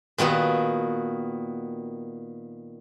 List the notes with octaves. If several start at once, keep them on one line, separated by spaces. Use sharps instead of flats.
A#2 D#3 B3 F#4